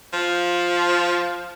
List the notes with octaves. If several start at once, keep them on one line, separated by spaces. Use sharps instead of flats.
F3